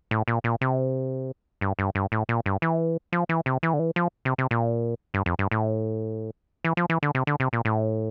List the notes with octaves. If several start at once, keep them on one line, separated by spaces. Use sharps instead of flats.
A2
A#2
A#2
C3
G2
G2
G2
A2
A#2
G2
E3
F3
E3
C3
E3
D3
E3
F3
C3
C3
A#2
G2
F2
G2
A2
E3
F3
E3
D3
C3
D3
C3
A#2
A2